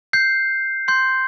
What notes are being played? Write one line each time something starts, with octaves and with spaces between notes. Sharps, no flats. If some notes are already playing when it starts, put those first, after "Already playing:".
G6 C7
C6 G6 C7